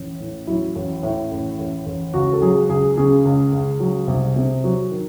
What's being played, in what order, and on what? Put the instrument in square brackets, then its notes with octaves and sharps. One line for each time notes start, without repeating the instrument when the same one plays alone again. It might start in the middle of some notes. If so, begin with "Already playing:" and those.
Already playing: [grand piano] A1
A2
F#3 E4
A1
A2
A1
A1
A1
C#2 F#4
A4
F#3 G#4
C#2 G#4
C#3 G#4
C#2
C#2
F#3
C2
C3
F#3
D#3